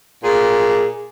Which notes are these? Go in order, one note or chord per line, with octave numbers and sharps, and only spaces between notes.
A#2 G#4